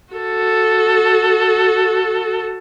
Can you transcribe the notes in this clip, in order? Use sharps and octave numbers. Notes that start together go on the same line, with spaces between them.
F#4 A4